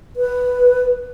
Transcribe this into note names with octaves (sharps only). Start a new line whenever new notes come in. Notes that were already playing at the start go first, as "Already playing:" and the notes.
B4